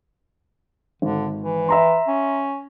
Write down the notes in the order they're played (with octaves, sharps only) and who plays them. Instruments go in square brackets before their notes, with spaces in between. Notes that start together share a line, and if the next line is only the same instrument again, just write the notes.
[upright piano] G#1 [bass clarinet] D3
[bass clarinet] E3
[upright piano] E5 A#5 C6
[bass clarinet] C#4